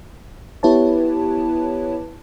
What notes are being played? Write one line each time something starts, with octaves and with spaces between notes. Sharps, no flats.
B3 E4 G4 B4 C#5 A5